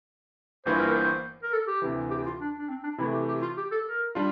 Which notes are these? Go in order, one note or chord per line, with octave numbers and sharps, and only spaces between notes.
G1 G2 E3 A#3 F4 C5
A#4
C5
A#4
A4
G4
D2 C3 E3
G4
F4
D4
D4
C4
D4
C3 E3 A3 E4
G4
G4
F4
G4
A4
A#4
G3 D4 F4